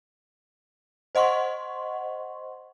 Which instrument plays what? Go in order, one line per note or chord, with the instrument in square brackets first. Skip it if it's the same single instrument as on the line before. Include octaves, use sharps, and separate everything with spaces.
[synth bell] C5 D#5 F#5 C6 C#6